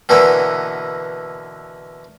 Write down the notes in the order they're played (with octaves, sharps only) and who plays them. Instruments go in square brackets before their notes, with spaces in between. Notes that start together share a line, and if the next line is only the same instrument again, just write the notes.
[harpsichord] B2 D3 E3 A#3 B3